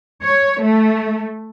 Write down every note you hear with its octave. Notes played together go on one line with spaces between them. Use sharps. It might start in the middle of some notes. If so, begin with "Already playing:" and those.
C#5
A3